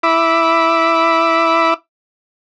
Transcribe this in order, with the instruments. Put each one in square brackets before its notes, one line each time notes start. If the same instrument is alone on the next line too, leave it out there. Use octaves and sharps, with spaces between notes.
[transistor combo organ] E4 E5 B5 D6